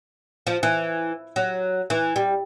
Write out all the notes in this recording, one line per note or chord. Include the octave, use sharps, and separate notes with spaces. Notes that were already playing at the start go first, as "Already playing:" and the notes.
F3
E3
F#3
E3
G3